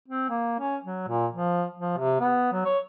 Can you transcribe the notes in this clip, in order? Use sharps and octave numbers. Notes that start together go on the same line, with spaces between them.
C4
A#3
C#4
F#3
A#2
F3
F3
C3
B3
F#3
C#5